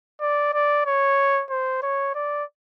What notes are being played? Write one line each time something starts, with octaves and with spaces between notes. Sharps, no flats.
D5
D5
C#5
C5
C#5
D5